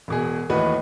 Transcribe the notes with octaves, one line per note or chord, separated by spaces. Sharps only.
E1 B2 G#4
D#2 A2 E3 F#4 B4 D#5